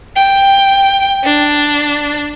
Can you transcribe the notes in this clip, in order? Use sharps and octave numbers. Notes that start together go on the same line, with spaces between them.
G5
D4